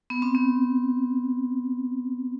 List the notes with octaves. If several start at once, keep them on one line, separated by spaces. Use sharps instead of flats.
B3
C4
B3